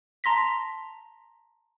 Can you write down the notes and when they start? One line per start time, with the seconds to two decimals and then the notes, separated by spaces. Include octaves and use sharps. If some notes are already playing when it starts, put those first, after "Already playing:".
0.24 A5 A#5 C6 A#6 B6